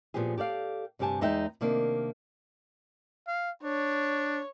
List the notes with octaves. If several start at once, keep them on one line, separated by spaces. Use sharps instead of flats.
A#2 C#3 F3 B3 G4 G#4
G4 A4 D5 F5
D2 G2 C3 G4 G#5 A5
E2 G#3 D#4 E5 G5
C3 D#3 A#3 D4
F5
D4 C#5